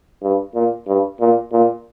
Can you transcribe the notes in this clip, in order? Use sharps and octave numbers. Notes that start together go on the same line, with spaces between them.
G2
A#2
G2
A#2
A#2